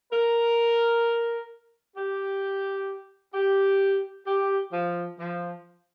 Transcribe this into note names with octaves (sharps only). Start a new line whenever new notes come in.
A#4
G4
G4
G4
F3
F3